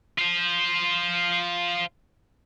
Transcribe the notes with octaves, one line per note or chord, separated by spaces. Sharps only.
F4 C5